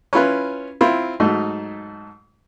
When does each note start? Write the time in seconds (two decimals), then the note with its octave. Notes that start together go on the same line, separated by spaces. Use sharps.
0.13 C#4 E4 F4 B4
0.81 C4 E4 F4
1.20 G#2 F#3 A3 D#4